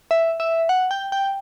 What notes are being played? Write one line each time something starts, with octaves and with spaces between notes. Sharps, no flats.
E5
E5
F#5
G5
G5